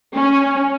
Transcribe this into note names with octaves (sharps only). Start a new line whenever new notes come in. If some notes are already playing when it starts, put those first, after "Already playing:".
C#4